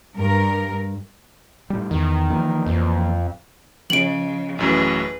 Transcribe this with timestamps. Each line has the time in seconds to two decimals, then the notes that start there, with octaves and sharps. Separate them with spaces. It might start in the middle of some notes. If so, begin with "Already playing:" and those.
0.16 G2 A#4
1.70 A2 G3
1.91 E2 D#3
2.30 E3 F3 A#3
2.66 F2
3.90 C#3 F3 D#5 D7 F#7
4.59 A1 F#2 A2 G#4 B4